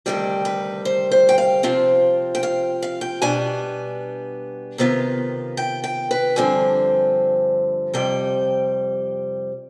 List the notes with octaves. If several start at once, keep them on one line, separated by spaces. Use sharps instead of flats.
D2 C3 D#3 G3 G4
B4
C5
C5
G5
F5
C3 F3 C4 F4
G5
F5
F5
G5
B2 G3 B3 D4 G#5
C3 D#3 B3 F4
G5
G5
B4
G2 D3 F3 C4 G#5
F2 C3 G3 G5